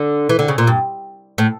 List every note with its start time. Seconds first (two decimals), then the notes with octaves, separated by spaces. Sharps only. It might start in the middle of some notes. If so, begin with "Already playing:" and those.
Already playing: D3
0.29 E3
0.39 D3
0.48 C#3
0.58 A#2
0.67 G2
1.38 A2